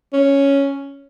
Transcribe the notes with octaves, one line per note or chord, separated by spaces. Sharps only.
C#4